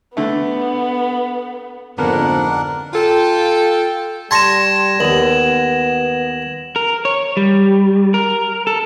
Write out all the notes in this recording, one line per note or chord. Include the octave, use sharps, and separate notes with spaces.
D3 A3 B3
F2 G#2 D3 A#3 B3 D4 A#4 F#5
F4 A4 G5
G3 A5 C6 C#6 G#6 A#6 E7
D#2 B3 E7 F#7
A#4
C#5
G3
A#4
A4